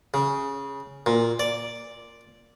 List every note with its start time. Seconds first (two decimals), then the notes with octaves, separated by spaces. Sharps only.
0.14 C#3
1.06 A#2
1.39 D5